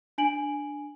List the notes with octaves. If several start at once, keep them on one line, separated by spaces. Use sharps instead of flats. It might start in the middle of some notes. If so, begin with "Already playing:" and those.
D4 G#5 D7 F#7